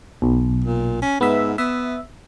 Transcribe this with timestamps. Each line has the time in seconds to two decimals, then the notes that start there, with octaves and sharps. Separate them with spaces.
0.22 B1
0.65 A#2
1.02 C#4
1.21 G#2 B3 E5
1.58 B3 E5